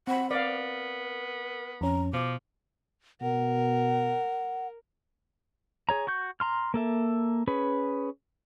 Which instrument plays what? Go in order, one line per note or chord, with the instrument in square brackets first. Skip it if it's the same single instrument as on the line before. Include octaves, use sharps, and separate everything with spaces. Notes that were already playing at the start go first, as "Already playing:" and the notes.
[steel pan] C4 B5 [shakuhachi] F#5
[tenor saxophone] B3 [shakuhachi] A#4 [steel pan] D5 F5
[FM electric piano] F2 C#4 [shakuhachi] A#5
[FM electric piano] B2 [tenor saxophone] F3 [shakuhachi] D6
[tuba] B2 [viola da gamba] A#4 [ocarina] F#5
[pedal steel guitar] G#4 C#5 A#5
F#4 C#6 G6
A#5 C6 F6
A#3 A4 E5
C#4 G#4 B4